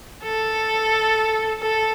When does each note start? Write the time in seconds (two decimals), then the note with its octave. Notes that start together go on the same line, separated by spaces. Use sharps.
0.24 A4
1.61 A4